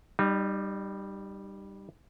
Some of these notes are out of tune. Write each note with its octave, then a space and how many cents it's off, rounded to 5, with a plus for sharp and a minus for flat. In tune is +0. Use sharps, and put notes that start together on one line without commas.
G3 +0 D#4 -35